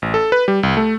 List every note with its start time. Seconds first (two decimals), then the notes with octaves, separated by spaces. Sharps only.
0.02 A1
0.14 A4
0.32 B4
0.48 G3
0.63 C2
0.77 A3